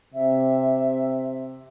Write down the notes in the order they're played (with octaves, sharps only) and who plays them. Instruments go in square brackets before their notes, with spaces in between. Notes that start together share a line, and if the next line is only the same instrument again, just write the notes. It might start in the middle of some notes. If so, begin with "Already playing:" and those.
[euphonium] C3 [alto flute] E5